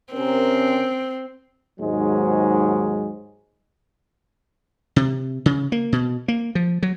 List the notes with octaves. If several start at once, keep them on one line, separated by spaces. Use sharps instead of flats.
C3 C4 C#4 A#4
D#2 G#2 F#3 G#3
C3
C#3
A#3
B2
A#3
F3
F#3